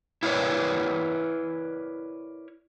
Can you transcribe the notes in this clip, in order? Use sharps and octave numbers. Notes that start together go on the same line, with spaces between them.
E4 A#4 B4 C#5 D5